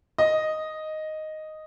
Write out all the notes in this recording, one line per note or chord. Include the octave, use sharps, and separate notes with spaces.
D#5